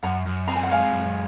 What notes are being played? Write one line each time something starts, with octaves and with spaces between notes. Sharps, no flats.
F#2 F#5 A#5
F#2
C4 A#5
G#5
F#5
G#3 F5 G#5
F#2